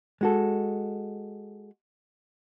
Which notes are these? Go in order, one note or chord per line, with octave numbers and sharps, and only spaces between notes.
G#3 F#4 A4